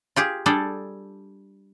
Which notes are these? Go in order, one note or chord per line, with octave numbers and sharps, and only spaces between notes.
F4 G4 G#4
G3 D4 G#4 A4